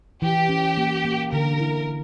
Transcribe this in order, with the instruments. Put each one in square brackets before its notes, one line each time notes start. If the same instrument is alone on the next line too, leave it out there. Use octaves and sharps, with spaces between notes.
[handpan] E3 [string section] G4
[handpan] C#4
A#3
A#3
[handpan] D3 [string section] A#4
[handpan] E4